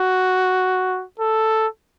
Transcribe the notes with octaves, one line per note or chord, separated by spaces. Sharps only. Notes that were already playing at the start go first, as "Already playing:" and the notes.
Already playing: F#4
A4